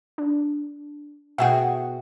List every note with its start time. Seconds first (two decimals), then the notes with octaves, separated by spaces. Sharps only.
0.18 D4
1.38 B2 F#4 G#4 E5 F#5 G5